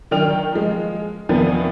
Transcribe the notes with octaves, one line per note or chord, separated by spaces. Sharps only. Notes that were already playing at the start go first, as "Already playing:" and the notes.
D#3 F#3 D4 G5 F6 F7
F3 G#3
E2 C3 D#3 F3 B3 D4